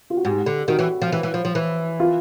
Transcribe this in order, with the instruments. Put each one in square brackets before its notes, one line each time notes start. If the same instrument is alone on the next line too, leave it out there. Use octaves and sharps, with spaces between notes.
[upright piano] F4
F#4
[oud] G#2 [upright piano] G4
[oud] D3
[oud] D#3 [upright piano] F#4
[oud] E3
F3
E3
E3
F3
F3
E3
[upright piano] F4